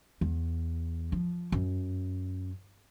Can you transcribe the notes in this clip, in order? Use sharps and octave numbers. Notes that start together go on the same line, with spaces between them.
E2
F3
F#2